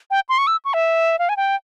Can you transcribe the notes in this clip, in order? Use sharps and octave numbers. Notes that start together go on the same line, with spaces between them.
G5
C6
C#6
E6
C#6
E5
F5
G#5
G5